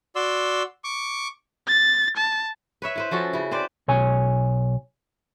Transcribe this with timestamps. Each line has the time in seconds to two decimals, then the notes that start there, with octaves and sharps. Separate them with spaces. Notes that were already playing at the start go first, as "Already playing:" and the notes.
0.16 F#4 D5 C6 E6
0.84 C#6 D6
1.68 A6
2.17 A5
2.82 B4 C#5 E5
2.96 E4 B4 C5
3.11 F3 C#4 F#4 A4
3.33 C#3 E4
3.51 C4 B4 C5 D5
3.88 B1 C#5 G#5